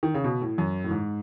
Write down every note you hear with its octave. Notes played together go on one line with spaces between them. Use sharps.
D#3
C#3
B2
A2
F#2
A2
G#2